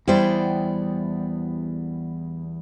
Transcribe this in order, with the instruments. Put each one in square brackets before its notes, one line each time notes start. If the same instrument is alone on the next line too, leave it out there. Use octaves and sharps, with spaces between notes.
[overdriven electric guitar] E2 [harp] G3 [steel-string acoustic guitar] B3 D5 G5 [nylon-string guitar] E4 C5